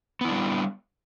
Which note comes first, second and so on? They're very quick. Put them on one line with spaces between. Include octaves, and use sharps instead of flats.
B3 E4 D4 G3